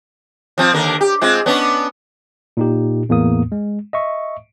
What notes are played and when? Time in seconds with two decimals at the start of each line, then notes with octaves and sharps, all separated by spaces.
0.58 F3 C4 F4
0.72 D#2 D3 A#4
1.01 G4
1.21 G#3 C4 F4
1.46 B3 C#4 D4
2.57 A#2 D#4 G4
3.09 E2 A2 A#3 D#6
3.52 G#3
3.93 D#5 E5 C#6